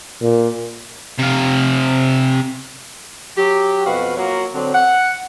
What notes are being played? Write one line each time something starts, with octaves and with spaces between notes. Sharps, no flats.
A#2
C3 F5
F#3 G4
F2 B2 F#4 B4 F5
F#3 A#3 F4 F#4 C#5
D3 F#3 C4
F#5